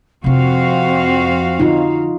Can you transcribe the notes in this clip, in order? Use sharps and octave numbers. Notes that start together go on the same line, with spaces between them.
F2 C3 C4 F4 F#4 F5
D3 D#4 F4